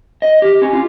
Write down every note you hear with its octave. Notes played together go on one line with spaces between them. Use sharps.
D#5
G4
C#4
F4